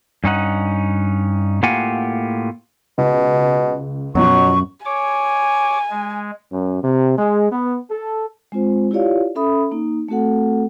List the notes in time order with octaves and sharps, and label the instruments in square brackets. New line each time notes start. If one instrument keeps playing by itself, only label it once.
[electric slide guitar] G2 C#4 D#4 F#5
A2 A#3 F4 G4 F#5 G#5
[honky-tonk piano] C#2 [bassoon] B2
[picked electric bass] F#2 [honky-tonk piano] B2 F3 [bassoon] F#3 [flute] C#6
[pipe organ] C#5 D6 [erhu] G#5
[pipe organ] G#3
[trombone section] F#2
C3
G#3
B3
A4
[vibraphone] G#3 C4 F4 C5
E4 F4 G4 C#5 D5 F5
C#4 A4 E5 B5 D#6
A#3 D#4
A3 C4 F#4 A4 F#5